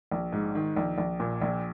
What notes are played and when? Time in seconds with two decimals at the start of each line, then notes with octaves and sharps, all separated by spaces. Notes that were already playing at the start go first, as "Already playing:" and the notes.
0.12 A#1
0.32 G#2
0.55 D#3
0.76 A#1
0.98 A#1
1.20 A#2
1.42 A#1